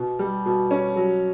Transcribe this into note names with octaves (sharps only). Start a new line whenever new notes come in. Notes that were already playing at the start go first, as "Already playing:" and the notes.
Already playing: B2
G3
B2
C#4
F#3